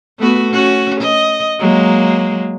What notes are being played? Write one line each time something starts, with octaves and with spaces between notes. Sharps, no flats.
A3 B3 F#4
C#4 F#4
D#5
F#3 G#3 A#3